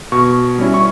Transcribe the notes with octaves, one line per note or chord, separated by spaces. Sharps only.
B2 C#6
G3 C#4 E4
C#6